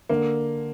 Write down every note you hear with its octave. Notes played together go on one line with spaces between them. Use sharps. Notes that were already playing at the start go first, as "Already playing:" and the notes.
D3 A#3